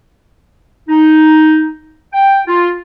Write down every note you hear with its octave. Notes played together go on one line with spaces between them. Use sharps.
D#4
G5
F4